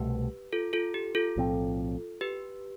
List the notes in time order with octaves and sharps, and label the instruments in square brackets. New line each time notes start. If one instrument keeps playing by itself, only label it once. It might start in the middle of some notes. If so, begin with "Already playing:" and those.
Already playing: [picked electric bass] C2 B2 A3 [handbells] G4 B4
[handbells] F4 A4
F4 A4
G4
F4 A4
[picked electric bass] B1 A2 F3 C4
[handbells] G4 B4